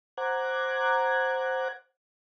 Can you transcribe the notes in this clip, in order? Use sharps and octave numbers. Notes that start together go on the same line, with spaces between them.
C5 F#5 A#5 D6 F#6 G#6